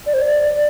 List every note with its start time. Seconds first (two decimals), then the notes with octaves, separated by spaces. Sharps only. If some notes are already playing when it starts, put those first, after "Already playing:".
0.06 D5
0.14 C5
0.21 D5